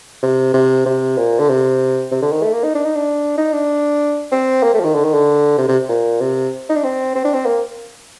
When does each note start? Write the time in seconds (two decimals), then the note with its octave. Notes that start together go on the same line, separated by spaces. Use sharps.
0.23 C3
0.54 C3
0.86 C3
1.18 A#2
1.39 D3
1.49 C3
2.12 C3
2.22 D3
2.32 D#3
2.43 A3
2.53 A#3
2.64 D#4
2.75 D4
2.85 D#4
2.96 D4
3.38 D#4
3.53 D4
4.32 C4
4.63 A#3
4.74 A3
4.80 F3
4.84 D#3
4.95 D3
5.05 D#3
5.14 D3
5.58 C3
5.68 C3
5.89 A#2
6.21 C3
6.69 D#4
6.76 D4
6.84 C4
7.15 C4
7.25 D4
7.34 C4
7.46 A#3